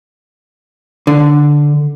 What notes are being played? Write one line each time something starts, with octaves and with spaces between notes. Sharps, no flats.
D3